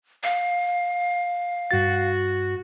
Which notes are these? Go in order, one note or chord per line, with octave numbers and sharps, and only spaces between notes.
F5
G2 F#4 A6